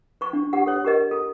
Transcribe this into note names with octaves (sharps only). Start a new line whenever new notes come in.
C5 C#6
D4
G4 F#5
A4 C#5
G4 A#4 D#5
A4